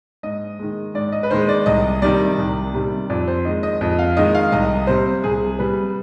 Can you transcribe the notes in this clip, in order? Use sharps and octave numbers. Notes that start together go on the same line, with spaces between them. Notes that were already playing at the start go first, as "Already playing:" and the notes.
G#2 D#5
D#3 G#3
G#2 D5
D#5
B4
D#3 G#3 C5
D5
C2 D#5
C3 D#3 G3 D5
C2
C3 D#3 G3
F2 D5
C5
D#3 G#3 D#5
D#5
F2 D#5
F5
D#3 G#3 D#5
F5
C2 D#5
C3 G3 C5
C2 G#4
C3 G3 B4